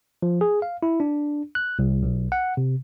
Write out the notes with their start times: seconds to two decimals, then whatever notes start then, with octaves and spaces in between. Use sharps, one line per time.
0.22 F3
0.41 G#4
0.62 F5
0.83 E4
1.00 D4
1.55 F#6
1.79 C2
2.03 B1
2.32 F#5
2.57 C3